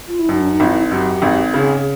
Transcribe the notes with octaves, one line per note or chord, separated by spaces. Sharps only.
F4
E4
F#2 D#4
D4
D#4
G#1 F4
E4
F#2 G4
G#1
C#3 G#4